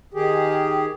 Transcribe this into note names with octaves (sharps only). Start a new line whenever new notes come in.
D#3 G4 G#4